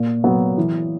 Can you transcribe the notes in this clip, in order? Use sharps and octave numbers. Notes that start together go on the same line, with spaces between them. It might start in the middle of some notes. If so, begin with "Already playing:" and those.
Already playing: A#2
F#3 B3
E3